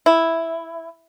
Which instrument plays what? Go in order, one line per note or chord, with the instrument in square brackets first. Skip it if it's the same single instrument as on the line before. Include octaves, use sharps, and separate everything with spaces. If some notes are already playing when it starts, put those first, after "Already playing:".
[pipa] E4